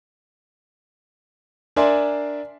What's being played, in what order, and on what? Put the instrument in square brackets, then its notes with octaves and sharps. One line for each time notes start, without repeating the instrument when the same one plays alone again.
[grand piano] D4 A#4 D5 E5 G#5 C6